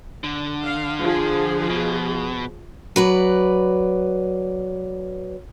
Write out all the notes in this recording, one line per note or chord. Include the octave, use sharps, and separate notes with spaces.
D3
F5
F3 G#4
B2
F#3 B4 D5